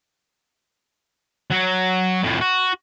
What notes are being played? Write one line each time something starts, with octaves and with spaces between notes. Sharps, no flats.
F#3
F2 A2
F#4